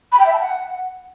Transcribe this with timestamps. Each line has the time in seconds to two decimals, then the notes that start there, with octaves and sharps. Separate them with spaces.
0.12 B5
0.19 G5
0.26 E5
0.33 A5
0.40 F#5